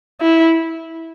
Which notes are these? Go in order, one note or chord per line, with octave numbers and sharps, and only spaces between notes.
E4